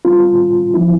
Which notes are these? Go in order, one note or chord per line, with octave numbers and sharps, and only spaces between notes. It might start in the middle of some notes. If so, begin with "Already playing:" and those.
G3 C4 F4
F3 C4 E4